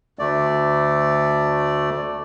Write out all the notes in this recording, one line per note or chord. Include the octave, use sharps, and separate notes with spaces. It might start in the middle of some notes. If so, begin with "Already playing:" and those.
D2 A3 D5